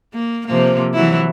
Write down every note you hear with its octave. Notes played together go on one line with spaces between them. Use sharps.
A#3
C3 F3 A#3
E3 F#3 E4